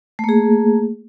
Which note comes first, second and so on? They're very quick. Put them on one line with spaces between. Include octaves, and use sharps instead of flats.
A3 A#3 G#4